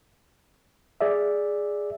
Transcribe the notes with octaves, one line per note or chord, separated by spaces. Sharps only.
G#4 D5 E5